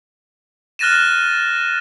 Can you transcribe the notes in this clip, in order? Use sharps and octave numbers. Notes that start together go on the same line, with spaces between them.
F6 F#6 A6 A#6 D#7 E7